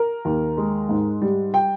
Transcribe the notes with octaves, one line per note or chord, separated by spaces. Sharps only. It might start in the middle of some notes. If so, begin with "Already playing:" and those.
Already playing: A#4
D#2
G#3
G#2
G3
G5